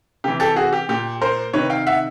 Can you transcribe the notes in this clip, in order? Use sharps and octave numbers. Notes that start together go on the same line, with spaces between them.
C3 E3 G4
G4 A4
F#4 G#4
G4
A#2 G4
A#4 C5
C3 D#3 B4 C#5
F5 G5
E5 F#5